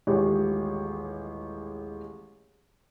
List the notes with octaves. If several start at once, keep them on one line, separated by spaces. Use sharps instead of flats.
D#1 A1 G#3 G4 G#4 C#5